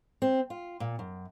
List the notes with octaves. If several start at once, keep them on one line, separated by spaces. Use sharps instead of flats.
C4
F4
A#2
F#2